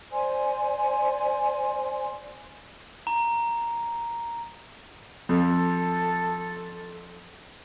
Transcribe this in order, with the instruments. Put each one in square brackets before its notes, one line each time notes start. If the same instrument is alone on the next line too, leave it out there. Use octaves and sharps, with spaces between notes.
[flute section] C5 D5 G#5 C6
[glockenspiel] A#5
[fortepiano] F2 [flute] A4